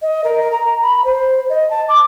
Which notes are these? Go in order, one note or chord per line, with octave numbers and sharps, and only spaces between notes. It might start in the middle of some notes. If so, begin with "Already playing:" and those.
D#5
A#4
A#5
B5
C5
D#5
A5
D6